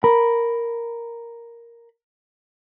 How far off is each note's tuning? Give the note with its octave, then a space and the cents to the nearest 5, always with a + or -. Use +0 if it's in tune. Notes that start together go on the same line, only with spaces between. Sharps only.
A#4 +0 B5 +0